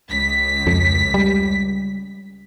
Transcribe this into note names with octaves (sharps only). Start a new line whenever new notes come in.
C#2 B6
F2
G3